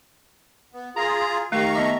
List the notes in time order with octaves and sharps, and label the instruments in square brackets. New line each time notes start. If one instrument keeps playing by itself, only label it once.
[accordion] B3
[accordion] F4 G#4 [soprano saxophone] A#5
[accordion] D#3 A#5 C#6 [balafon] A3 G4 [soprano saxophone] F5
[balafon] B3 D#5 D6 [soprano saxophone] E5